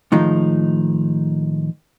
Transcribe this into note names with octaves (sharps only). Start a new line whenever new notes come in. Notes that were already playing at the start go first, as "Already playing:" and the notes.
A2 D#3 F3 G#3 D#4